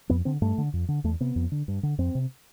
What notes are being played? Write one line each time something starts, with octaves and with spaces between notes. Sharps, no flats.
F2 B3
D3 C4
G2 A3
D3
F2
D3
E2 A3
C3 B3
F2
D3
G2
D3
F2 C4
C3